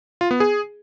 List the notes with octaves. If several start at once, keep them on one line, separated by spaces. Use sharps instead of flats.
F4
B3
G#4